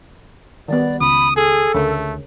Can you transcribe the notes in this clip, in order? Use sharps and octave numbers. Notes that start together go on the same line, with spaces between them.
D#3 G3 B3 D5
C#2 B5 D#6
G#4 A4
D2 C#3 A3 A#4